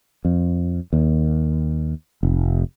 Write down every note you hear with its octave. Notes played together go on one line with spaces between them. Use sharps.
F2
D#2
F1